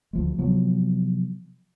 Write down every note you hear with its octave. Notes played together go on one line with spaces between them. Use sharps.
D2 F3 G#3
C3 F3 F#3 B3